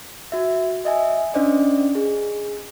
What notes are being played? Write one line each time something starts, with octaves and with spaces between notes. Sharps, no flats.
F#4 E5
D#5 E5 G#5
C#4 D4 C5 D5 D#5
G#4